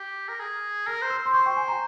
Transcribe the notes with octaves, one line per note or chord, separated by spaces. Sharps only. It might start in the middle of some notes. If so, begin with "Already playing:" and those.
Already playing: G4
A#4
G#4
A#4 F6
C5
E6
C5
C6
C5 C#6
G5
G#5
A#5